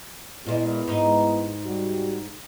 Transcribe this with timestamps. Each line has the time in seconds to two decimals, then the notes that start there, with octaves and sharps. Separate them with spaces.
0.46 A#2 G#3 B3 E4 G#4
0.88 G#2 D#4
1.65 G3 F#4